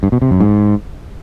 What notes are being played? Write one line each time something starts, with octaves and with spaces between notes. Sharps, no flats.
G2
B2
C3
F#2
G#2